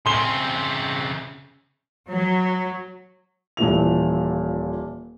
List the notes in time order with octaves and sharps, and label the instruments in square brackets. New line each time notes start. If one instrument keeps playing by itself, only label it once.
[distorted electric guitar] C#3 C4 [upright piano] C6 G7
[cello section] F#3
[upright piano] D#1 A#2 E3 F7